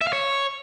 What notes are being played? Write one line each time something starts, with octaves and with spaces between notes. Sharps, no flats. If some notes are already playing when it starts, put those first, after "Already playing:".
E5
F5
C#5